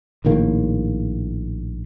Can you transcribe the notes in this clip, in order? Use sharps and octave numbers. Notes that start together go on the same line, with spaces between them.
A#1 A2 D#3 A#3